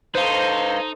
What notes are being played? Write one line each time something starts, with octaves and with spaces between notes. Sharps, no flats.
D#4 A4 B4 C5 F5 C6